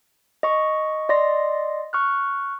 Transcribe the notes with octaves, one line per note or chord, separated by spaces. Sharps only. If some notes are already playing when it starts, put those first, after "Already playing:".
D#5 C#6
D5 D#5 C6 A#6
C#6 F6 F#6